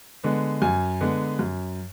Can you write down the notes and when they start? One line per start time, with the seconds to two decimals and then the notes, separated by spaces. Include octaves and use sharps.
0.24 D3 G#3 B3
0.62 F#2 G#5
1.01 D3 G#3 B3
1.39 F#2